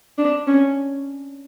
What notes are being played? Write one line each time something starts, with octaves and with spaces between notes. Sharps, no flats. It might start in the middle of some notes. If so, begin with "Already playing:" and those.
D4
C#4